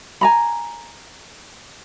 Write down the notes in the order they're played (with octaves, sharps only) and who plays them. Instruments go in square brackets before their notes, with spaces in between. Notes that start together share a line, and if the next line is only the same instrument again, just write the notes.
[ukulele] G#5 A#5 B5